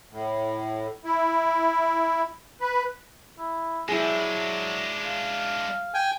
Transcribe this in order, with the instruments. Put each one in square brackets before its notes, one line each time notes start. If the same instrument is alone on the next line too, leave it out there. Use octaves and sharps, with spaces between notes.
[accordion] A2
E4
B4
[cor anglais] E4
[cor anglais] F#3 [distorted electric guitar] G#3 D4 [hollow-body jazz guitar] E4 G#4
[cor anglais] F5
[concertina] G5 G#5